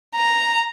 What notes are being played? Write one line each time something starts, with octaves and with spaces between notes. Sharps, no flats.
A#5